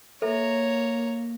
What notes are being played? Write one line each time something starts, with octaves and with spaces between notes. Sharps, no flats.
A#3 A4 B4 C#5 E5 A#5